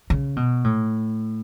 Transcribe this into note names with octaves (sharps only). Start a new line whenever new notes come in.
C#3
B2
A2